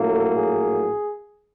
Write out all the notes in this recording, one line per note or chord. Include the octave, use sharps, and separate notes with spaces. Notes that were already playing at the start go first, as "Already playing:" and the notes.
Already playing: A#1 A2 F#3 A#3 A4
G#4